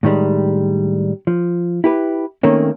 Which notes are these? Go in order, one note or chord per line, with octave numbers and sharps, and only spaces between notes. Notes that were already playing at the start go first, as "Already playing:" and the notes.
A2 D#3 G3 G#3
F3
E4 G4 B4
D#3 A3 A#3 C4 C#4